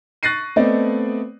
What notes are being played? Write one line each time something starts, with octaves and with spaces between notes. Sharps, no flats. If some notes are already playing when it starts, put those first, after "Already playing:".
C#6 F#6 A6 A#6 C7 D#7
A3 B3 C4 D5 D#5